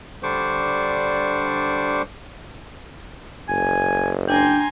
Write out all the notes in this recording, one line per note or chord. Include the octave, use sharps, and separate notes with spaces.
D3 G3 D4 C5 C#6 D6
F#1 G#5
D4 G5 G#5 A#5 C6